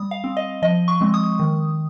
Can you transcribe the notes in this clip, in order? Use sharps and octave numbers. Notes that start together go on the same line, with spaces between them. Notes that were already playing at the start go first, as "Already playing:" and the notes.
Already playing: G3 D#6
F5
C4
D#5
F3 D#5
C#6
G#3 C4
D#6
D#3